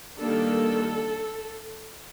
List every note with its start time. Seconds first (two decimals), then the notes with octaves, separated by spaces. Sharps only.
0.19 D#3 G3 A#3 D4 A4